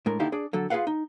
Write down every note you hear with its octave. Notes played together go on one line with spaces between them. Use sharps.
A2 G#3 D4 A#4
D#2 D3 D#4 E4 G4 F5
D4 G#4 D5
D3 F#3 A4
F4 G#4 A#4 B4 F5 F#5
D#4